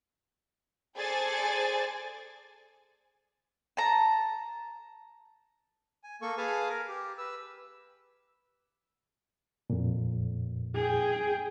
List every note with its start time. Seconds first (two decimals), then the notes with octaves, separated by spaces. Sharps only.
0.98 G#4 A4 C5 D5 G#5 A6
3.77 A5 A#5
6.04 G#5
6.22 A#3 A4 C#6
6.37 G#4 B4 F5 G#5 A5
6.68 A#4
6.88 G4
7.18 B4 E6
9.70 F2 A#2
10.76 G#4 G5